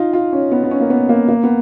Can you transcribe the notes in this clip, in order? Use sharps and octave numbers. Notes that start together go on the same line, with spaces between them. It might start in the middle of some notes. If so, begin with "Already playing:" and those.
Already playing: D#4 F4
F4
C#4
B3
B3
C#4
A#3
B3
A#3
A#3
B3